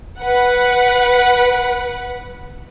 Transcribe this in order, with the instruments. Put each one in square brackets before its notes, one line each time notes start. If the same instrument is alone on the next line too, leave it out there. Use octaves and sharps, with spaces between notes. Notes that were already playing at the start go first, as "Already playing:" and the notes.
[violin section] B4 F#5